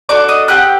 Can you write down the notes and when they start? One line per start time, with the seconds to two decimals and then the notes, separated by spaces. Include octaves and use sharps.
0.09 D4 F#4 A4 D5 D6
0.29 D#5 D#6
0.48 C4 G4 F#5 F#6